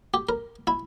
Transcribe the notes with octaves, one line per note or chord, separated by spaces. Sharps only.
G4
A#4
E4